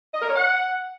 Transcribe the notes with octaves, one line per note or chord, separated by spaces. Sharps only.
D#5
A#4
C#5
F#5